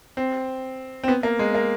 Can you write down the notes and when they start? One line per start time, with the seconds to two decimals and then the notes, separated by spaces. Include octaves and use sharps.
0.17 C4
1.04 C4
1.08 B3
1.23 A#3
1.39 G#3
1.54 A#3